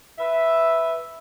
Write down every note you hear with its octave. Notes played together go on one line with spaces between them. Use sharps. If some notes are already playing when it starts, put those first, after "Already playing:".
B4 E5